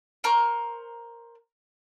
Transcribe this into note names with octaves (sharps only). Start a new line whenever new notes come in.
A#4 C5 A#5 C#6